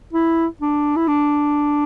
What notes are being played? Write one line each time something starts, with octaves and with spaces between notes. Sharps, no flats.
E4
D4
E4
D4